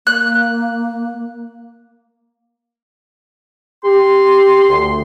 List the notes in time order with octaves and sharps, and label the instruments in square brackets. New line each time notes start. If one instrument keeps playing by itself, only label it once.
[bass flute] A#3 [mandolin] F#6
[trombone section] G4 [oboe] C6
[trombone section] D2